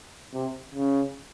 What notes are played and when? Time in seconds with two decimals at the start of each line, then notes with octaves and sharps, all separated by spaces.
0.33 C3
0.75 C#3